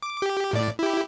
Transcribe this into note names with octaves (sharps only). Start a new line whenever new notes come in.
D6
G4
A2 D5
E4 G4